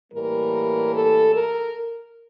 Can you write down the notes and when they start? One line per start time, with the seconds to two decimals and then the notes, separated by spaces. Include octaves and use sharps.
0.11 A2 E3 G3 A#3 A#4
0.93 A4
1.33 A#4